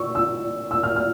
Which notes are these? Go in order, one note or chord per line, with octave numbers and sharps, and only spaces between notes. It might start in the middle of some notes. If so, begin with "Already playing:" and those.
Already playing: C#6 E6
E6
E6
F6
F6